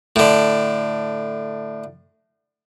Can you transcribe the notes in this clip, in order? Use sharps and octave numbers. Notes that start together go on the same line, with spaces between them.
A2 D3